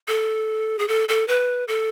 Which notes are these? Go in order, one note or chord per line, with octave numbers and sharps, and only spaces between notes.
A4
G#4
A4
A4
B4
A4